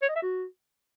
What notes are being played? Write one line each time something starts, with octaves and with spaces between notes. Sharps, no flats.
C#5
D#5
E5
F#4